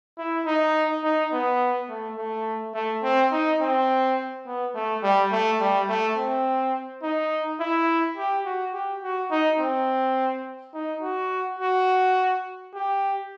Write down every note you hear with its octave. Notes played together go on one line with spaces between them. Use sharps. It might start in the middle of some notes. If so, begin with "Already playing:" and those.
E4
D#4
D#4
B3
A3
A3
A3
C4
D#4
C4
B3
A3
G3
A3
G3
A3
C4
D#4
E4
G4
F#4
G4
F#4
D#4
C4
D#4
F#4
F#4
G4